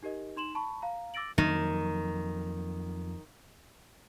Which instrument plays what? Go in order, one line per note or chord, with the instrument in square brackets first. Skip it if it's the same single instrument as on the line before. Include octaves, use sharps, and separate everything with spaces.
[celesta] D#4 G4 A#4 D#5
D#4 C6 E7 F#7
A5 B5 C#6
F5 A#5
D6 E6 A6 A#6 D7 F#7
[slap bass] F2 F#3 A#3 [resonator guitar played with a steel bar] D#3